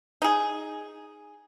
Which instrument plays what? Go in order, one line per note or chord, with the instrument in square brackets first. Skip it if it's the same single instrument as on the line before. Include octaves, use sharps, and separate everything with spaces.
[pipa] D#4 G#4